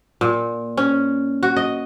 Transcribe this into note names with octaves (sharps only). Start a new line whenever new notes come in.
A#2
C#4
F#4
D#5